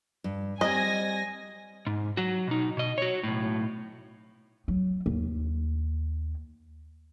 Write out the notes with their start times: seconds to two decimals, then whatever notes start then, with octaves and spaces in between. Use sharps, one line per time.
0.24 G2
0.61 G3 C4 D#5 G#5 A#6
1.87 G#2
2.17 F#3 F#4
2.47 B2 D#4
2.77 B2 D#5
2.98 F#4 C#5
3.23 B1 A2
4.68 F#3
5.06 D#2